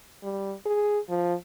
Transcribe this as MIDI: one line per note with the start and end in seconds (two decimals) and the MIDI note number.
0.24 0.54 55
0.66 0.99 68
1.10 1.34 53